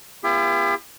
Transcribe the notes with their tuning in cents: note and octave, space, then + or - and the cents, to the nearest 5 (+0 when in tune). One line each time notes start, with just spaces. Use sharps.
B3 -40 E4 +45 G4 +45